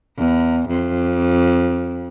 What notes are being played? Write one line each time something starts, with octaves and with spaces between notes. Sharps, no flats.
E2
F2